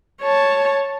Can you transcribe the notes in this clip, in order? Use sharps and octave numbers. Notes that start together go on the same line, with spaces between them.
C#5 A5